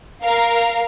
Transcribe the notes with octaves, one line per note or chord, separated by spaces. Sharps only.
A#4 F5